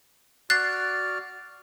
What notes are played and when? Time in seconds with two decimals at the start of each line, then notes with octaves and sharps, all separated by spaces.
0.50 F#4 D5 F6 F#6 A6 C7